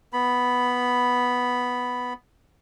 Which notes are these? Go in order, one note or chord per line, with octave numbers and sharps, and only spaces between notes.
B3 B5